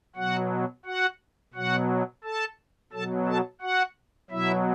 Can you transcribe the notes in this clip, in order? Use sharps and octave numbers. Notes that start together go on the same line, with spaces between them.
B2 F#3 F#4 F#5
F#4 F#5
B2 F#3 F#4 F#5
A4 A5
B2 F#3 A4 A5
A4 A5
F#4 F#5
B2 F#3 E4 E5